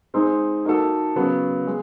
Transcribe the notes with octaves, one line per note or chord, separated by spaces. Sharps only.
G#3 C4 D#4
A#3 D#4 F#4 A4
C#3 F#3 B3
G#3